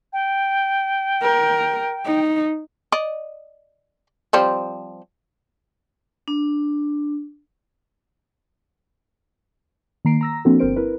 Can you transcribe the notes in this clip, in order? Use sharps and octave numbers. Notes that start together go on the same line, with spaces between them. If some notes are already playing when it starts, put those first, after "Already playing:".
G5
A#4
D#4
D5 D#5
F3 G3 C4
D4
D#3 A#3 A#5 C7 D7
A#5 E6 A#6
F3 A#3 C4 D4 F#4 A4
G1 C4 A#4 C5 D7
E4 A#4 B4